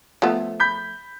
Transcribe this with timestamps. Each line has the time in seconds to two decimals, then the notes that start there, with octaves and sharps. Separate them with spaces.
0.22 F3 A3 B3
0.60 B5 G6 B6